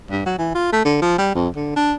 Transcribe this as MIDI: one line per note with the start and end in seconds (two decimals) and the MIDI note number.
0.11 0.23 43
0.26 0.36 54
0.38 0.50 52
0.55 0.69 65
0.72 0.83 57
0.85 0.97 50
1.01 1.17 53
1.18 1.33 55
1.35 1.48 41
1.56 1.73 50
1.76 1.93 62